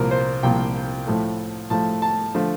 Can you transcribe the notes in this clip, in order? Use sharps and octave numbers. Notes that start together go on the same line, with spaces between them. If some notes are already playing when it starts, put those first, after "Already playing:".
Already playing: C2 A#2 F3 A#4
C5
C2 A#2 F3 G5
A2 F3 A3
A2 F3 A3 A5
A5
D3 F3 A3